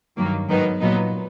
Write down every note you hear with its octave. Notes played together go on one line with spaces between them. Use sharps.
G2 D#3 F#3 A#3
G#2 D#3 F#3 B3 D#4
A#2 F#3 B3 D#4